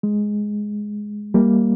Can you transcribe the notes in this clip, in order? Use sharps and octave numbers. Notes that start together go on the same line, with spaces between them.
G#3
G3 A#3